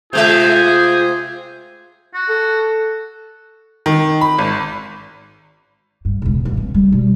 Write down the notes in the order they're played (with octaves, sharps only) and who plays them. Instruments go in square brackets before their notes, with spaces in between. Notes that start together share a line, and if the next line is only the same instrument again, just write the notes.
[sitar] C3 G#3 E5 [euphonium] F4 [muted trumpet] G#4 [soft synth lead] G6
[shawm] F#4
[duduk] A4
[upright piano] D#3
B5
G#1
[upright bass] G2
E1 C#2
G1
C#4
G3
B2 G3